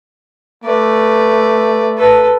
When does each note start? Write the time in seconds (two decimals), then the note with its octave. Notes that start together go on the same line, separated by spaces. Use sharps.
0.64 A3 B4 D5
1.97 A4 B4